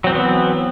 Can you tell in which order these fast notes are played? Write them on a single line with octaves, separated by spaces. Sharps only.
F#3 C4 E3 B3